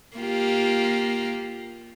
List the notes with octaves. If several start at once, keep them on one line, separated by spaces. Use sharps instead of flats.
A#3 F4 G4